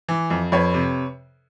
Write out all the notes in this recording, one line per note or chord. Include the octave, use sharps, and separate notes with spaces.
E3
F2
F2 B4 C#5
C3